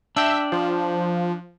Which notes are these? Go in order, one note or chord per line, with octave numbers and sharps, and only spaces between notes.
D4 E5 G5
F3